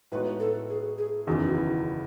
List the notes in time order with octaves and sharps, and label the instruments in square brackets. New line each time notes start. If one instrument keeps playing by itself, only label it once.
[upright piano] A2 G#3 B3 D#4 F#4 [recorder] B4
[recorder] A4
G#4
G#4
[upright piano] F#1 E2 D#3 [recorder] F#4
[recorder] F#4
E4